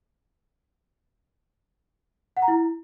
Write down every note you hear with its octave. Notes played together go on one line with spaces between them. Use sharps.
F#5
A#5
E4